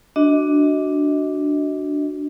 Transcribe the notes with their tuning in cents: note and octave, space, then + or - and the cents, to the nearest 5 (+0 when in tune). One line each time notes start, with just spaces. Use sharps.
D4 +0 F#4 +0 D#5 +30